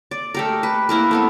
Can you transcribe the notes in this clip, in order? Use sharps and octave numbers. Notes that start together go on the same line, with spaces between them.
D5
A3 G4 A#4
B4
A#3 E4 A#4 B4
A3 B3 C4